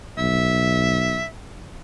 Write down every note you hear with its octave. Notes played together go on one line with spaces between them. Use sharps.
B1 E5